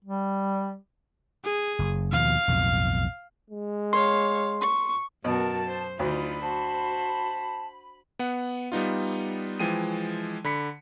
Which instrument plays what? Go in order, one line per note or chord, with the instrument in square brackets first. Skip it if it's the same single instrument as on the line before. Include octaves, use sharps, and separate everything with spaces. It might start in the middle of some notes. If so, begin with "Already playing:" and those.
[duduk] G3
[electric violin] G#4
[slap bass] F#1
[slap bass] D#2 B2 F3 [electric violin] F5
[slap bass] B1 F2 A2
[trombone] G#3
[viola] C#5 F5 [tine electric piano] C6
[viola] C#6
[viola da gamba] F#2 F#4 A#4 [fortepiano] B2 [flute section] A5
[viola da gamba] C5
[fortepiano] D2 [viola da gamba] D4 D#4 F4 [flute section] B5
[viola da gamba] F#4 C5 [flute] A5
[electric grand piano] B3 F#5
G3 B3 D#4 F4
E3 F3 G#3 G5 D#7
D3 B5 B6 C#7